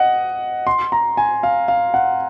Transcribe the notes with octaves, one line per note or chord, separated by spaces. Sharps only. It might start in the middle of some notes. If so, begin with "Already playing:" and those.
Already playing: D#5 F#5
C6
A#5
G#5
F5
F5
F#5